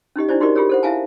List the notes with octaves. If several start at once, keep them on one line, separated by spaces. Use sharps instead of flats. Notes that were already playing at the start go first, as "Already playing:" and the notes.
C#4 D#4 G4 D#5
D4 E4 C5 D5
D#4 F#4 G4 A#4 D5 D#5
F4 G4 G#4 A#4 C#5
A4 C5 F#5
E4 E5 F5 G#5 A5